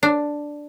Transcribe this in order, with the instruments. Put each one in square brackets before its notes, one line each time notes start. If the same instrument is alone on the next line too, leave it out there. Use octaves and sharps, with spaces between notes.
[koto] D4